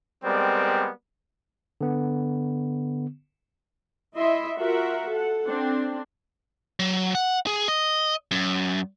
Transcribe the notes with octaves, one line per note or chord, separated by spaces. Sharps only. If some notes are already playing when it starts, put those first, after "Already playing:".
G3 G#3 B3 C4 A#4 D5
D3 B3
E4 D#5 E5 C6
F4 F#4 A#4 E5 F#5
A4 F#5
C4 D4
F#3
F#5
G#4
D#5
F#2